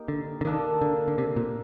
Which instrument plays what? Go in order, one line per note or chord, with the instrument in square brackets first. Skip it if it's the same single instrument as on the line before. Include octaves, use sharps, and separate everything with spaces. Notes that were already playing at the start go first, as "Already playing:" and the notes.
Already playing: [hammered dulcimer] A#3 D#4 G4
[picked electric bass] D3
D3
[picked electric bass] D#3 [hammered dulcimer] A#3 D4 A4
[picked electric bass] D3
D3
C3
A#2